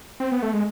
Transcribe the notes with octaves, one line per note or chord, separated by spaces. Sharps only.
C4
B3
A3
G#3